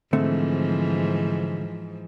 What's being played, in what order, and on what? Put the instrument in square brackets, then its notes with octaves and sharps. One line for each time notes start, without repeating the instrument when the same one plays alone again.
[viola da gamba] G#2 E3 F3 [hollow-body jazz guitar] D3 A3 C4